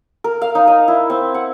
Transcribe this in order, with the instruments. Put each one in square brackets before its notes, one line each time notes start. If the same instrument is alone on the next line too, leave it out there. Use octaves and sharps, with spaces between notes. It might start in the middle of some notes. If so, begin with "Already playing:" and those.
[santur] A#4
F5
D#4
D#5
E4
C4
F#5